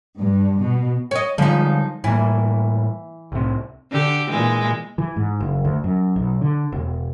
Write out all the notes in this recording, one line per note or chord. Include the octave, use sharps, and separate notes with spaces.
G2
B2
C#5 D#5
D3 F3 G3 G#3 D#4
A2 E3 G3 A#3
C2 A2 C3
D3 G4
A#2 E3 G#3
E3
G#2
F#1
D2
F#2
B1
D3
E1